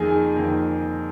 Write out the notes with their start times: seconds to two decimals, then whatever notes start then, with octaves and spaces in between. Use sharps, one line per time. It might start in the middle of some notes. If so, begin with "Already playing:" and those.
Already playing: F2 D#3 A#3 D#4 G#4 G#5
0.36 F2 D#3 A#3